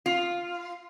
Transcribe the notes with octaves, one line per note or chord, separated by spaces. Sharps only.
F4